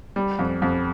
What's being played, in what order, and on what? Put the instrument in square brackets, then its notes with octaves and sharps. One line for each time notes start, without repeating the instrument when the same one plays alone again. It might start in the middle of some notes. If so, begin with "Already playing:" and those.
[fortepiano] G3
F2
F2